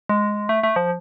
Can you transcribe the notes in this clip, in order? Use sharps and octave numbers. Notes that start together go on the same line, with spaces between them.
G#3
A3
A3
F3